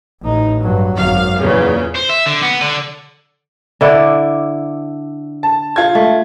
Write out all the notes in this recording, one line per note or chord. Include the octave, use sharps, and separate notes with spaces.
A1 D#4
G2 F#3
G#1 F#2 F5
E2 A#2 C#3
C5
E5
D3
B3
D3
D3 E4 D5
A5
F4 G#6
A3